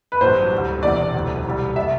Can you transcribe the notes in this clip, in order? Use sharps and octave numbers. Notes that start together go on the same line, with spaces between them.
B4
A1 G2 F#3 C5
D2 D3 G3
E1 E2 C3 D5
E1 D2 C3 F#3
C2 B2 G3
B2 F#3 E5